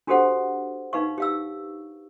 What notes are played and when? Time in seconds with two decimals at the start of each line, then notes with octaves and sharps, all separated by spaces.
0.07 D4 F#4 G4 A4 C5 F#5
0.93 D#4 B4 F5 C#6
1.18 G4 F5 E6